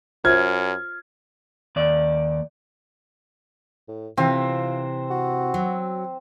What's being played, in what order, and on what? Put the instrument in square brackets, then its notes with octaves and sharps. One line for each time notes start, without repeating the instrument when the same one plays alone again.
[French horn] F#2 [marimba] F4 C5 E5 [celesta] F6 [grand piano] G#6
[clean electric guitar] D#2 D5
[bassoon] A2
[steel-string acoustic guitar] C3 E3 [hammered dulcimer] C4 [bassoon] F4
[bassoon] F#4
[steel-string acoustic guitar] F#3